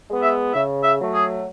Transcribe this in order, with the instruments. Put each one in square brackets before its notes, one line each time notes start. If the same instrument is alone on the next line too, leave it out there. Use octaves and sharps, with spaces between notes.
[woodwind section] G#3 B3
E5
C#3 E5
E5
F#3 A3
G#4